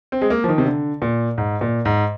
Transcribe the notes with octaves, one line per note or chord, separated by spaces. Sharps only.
C4
G#3
A#3
F3
D#3
C3
D3
A#2
G#2
A#2
G#2